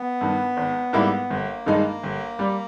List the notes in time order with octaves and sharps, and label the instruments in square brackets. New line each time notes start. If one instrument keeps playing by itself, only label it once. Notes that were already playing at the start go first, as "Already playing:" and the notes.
Already playing: [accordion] B3
[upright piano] G2 D#3
G#1
G#2 G3 A#3 E4
[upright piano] G1 [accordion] A#3
[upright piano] G2 D#3 G#3 D#4
G1
G3